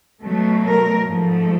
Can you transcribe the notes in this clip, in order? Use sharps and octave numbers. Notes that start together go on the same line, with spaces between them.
B2 F#3 A3
A#4
G#2 F3 A3